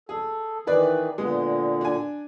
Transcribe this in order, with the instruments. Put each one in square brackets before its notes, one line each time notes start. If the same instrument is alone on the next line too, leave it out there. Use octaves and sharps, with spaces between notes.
[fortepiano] G#4 [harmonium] A4
[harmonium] D#3 E3 [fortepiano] G#4 B4 D5
[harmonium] A#2 D3 [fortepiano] G#3 B3
[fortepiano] D4 G#5